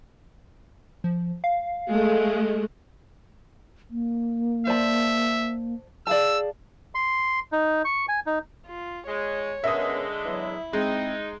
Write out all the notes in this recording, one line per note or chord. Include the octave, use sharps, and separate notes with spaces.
F3
F5
G#3 A3
A#3
C5 D5 E5 A5
G#4 D5 F5 A5 E6
C6
D#4
C#6
G#5
D#4
F4
G#3 C#5
D3 G#3 B3 C#4 A#4 E5 D#6
E2 F#3 E4
G#3 C4 D#4